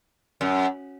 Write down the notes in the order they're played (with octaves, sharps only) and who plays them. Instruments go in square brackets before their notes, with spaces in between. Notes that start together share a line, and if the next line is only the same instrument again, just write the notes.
[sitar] F#2